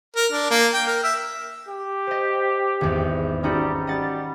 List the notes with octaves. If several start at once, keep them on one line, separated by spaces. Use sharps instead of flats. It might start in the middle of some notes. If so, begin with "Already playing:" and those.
A#4
D4
A#3
G5
A#4
E5
G4
C5 D#5
G#1 E2
G3 C#4 D#4 F#4
G3 D#5 F#5 A6